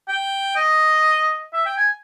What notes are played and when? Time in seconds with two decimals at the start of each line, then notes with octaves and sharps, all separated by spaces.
0.08 G5
0.56 D#5
1.54 E5
1.66 G5
1.78 G#5